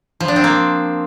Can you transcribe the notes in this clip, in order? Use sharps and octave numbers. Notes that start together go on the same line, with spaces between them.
F3
D4
C4
A#3